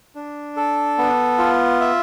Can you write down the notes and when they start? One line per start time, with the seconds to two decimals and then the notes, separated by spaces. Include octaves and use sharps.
0.15 D4
0.57 A4
0.98 B3
1.38 F4
1.81 E5